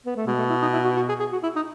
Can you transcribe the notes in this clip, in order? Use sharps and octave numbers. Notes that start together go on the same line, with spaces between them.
B3
A3
B2 G#3
A3
E4
D#4
E4
F#4
F#4
G#4
G#4
F#4
E4
D#4